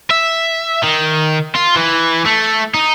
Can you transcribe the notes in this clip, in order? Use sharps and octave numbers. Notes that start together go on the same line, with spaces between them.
E5
D#3
F4
E3
A3
D#4